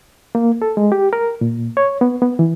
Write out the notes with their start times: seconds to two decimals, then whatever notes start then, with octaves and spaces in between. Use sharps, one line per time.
0.35 A#3
0.62 A4
0.77 G#3
0.92 G4
1.13 A#4
1.41 A#2
1.77 C#5
2.01 B3
2.22 B3
2.39 E3